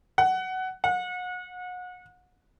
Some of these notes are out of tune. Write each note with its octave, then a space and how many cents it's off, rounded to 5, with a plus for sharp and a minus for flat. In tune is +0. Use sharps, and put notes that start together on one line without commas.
F#5 +15
F#5 -35